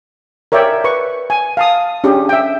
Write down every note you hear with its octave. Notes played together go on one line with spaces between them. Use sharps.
A#4 C#5 D5 E5 G5
B4 C#6
G#5
F5 A5 D#6
C#4 D4 G4 G#4
E5 G5